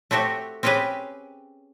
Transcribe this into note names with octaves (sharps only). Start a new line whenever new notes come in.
A3 C4 F#4 G4
C4 C#4 G4 G#4 B4